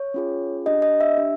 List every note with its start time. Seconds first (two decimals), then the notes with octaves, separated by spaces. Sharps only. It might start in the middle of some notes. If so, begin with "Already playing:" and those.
Already playing: C#5
0.14 C#4 F4 G#4
0.66 D4 G4 D#5
0.82 D#5
1.00 E5
1.17 D4 G4